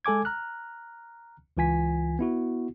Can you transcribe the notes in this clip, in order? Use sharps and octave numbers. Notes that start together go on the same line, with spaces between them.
G#3 A4 G#5 D6 G#6
A#5 F6 F#6
C#2 E3 F4 G#5 B6
B3 E4 F#4